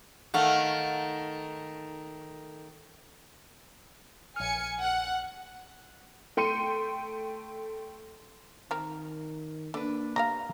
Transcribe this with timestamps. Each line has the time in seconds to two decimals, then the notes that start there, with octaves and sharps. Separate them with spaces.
0.34 D#3 A3 F5 F#5
4.36 A#1 G#5 F6 C#7
4.82 F#5
6.37 A3 G5 C6 C#7 D#7
8.71 D#3 C4 A#4
9.74 D3 A#3 D4 B4
10.16 B3 G4 F5 A#5